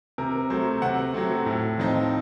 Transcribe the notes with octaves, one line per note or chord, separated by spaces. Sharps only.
C3 A#4
F#3 A3 C5
C3 F#5
F#3 A3 C4
A2
F3 C4 D#4